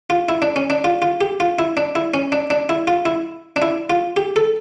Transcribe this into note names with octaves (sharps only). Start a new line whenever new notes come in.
F4
E4
D4
C#4
D4
F4
F4
G4
F4
E4
D4
E4
C#4
D4
D4
E4
F4
E4
D4
E4
F4
G4
A4